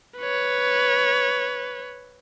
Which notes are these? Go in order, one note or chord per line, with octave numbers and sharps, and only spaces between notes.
B4 C#5